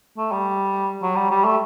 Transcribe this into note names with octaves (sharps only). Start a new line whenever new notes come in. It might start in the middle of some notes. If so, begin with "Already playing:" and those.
A3
G3
F#3
G3
G3
A3